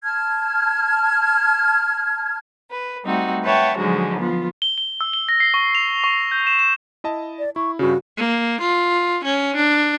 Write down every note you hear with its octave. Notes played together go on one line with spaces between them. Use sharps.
A5 F6 G#6
B4
G3 A3 C4 D#4 F#4
B4 C#5 E5 F#5 G5 A5
G#2 D3 F3 F#3 G#3 F#4
F3 B3 F4
G7
G7
E6
G7
A#6
C7
C#6
F7
C#6
G6
E7
E7
E4 D#5 A5
D5
E4 C#6
G2 C#3 F#4
A#3
F4
C#4
D4